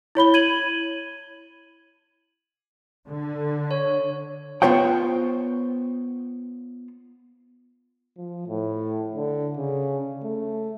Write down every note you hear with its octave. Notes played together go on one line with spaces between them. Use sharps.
E4 C#5 B5 G7
G#6 D#7 F#7
D3
C#5
B3 F4 C5 C#5 F#5 G5
F3
A2
D3
C#3
A3